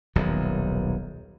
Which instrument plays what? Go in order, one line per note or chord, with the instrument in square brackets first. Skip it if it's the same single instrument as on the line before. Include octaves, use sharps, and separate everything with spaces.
[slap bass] D#1 B1 D#3